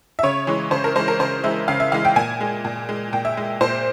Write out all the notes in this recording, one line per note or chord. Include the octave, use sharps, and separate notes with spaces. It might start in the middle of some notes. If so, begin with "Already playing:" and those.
E5
C#3 C#5
E3 G#3
C#3 C5
A#4
E3 G#3 C5
A#4
C#3 C5
E3 G#3 E5
C#3 F5
E5
E3 G#3 F5
G5
A#2 G#5
G#3
A#2
G#3
A#2 G5
E5
G#3
A#2 C5